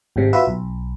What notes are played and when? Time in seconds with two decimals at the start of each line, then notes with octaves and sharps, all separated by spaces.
0.16 G#1 G#2 C3
0.33 F4 F#4 B4 E5
0.47 B1